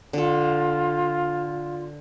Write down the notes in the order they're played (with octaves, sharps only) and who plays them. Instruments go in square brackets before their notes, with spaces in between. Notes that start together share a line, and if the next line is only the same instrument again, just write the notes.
[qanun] D3 A4 [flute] F4